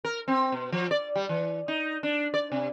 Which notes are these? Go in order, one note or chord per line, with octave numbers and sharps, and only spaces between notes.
A#4
C4
B2
F3
D5
G3
E3
D#4
D4
D5
C3